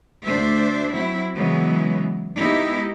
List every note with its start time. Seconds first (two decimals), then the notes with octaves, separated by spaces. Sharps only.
0.26 D2 D4 C5 E5
0.97 F#3 C4 E4
1.37 C#3 E3 F#3 G#3 B3
2.38 G#3 A#3 B3 D#4 E4 G4